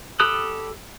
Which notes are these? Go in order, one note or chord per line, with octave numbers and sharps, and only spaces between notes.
G4 A4 B5 D#6 F#6